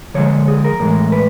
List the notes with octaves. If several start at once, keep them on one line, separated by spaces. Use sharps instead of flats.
D3 F3 G#3 C#5
G#4
A#4
A2 E3 G#3
B4